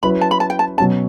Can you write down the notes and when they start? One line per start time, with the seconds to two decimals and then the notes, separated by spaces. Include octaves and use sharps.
0.03 F#3 C#4 E4 B4 B5
0.21 A5
0.31 B5
0.40 A5
0.50 G5
0.59 A5
0.77 B2 F#3 C#4 A5